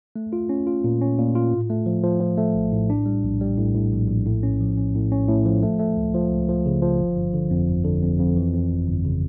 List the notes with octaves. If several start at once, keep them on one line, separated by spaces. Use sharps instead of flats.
A3
F4
C#4
F4
A#2
C#4
A#2
F4
A2
A3
F3
F3
F3
A3
A#1
A2
D4
G3
A#1
G3
A2
A2
A#1
A#1
A2
C#4
F3
C#4
A2
C#4
A2
F3
A3
A3
C#2
F3
C#2
F3
C#3
F3
G1
G1
D3
F2
G1
D3
F2
F2
E3
F2
G1
G1
C#3